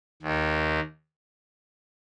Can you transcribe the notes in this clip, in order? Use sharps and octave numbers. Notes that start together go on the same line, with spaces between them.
D#2 D#3